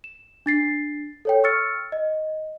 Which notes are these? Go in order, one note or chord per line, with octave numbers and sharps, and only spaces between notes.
E7
D4 A6 C7
A4 C#5 G5
C#6 E6 F6 A6 C#7
D#5